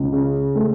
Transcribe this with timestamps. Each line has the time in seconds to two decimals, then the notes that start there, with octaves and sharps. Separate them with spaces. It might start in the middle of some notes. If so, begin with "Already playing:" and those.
Already playing: C#2
0.12 C#3
0.55 A3